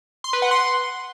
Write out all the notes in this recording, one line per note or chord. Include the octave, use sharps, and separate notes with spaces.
C6
B4
F#5
C6